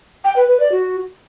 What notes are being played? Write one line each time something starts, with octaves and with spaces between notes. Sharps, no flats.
G5
B4
B4
D5
F#4